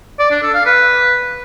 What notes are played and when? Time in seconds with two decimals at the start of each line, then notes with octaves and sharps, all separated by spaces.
0.19 D5
0.31 D4
0.43 A4
0.54 F5
0.66 B4